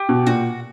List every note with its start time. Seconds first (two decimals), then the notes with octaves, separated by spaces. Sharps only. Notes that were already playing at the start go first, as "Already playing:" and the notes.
Already playing: G4
0.09 B2
0.27 A#2 F#4